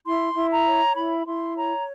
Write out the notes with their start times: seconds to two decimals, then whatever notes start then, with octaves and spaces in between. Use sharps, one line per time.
0.05 E4 C6
0.35 E4
0.51 A#5
0.66 C#5
0.95 E4 B5
1.26 E4 C6
1.56 C#5 A#5